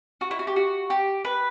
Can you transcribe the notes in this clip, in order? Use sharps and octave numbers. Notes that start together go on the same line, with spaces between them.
F#4
E4
F#4
G4
F#4
G4
B4